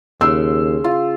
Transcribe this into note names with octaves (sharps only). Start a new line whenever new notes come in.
D#2 C#3 C6 E6
F4